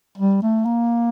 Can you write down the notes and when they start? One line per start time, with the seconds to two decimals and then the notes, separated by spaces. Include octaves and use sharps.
0.18 G3
0.42 A3
0.65 A#3